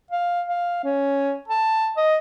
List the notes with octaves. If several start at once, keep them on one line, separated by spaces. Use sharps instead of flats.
F5
F5
C#4
A5
D#5